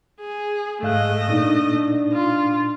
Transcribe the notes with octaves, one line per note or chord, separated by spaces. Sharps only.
G#4
G#2 A3 D#5 F5 F#6
A#2 D4 D#4
F4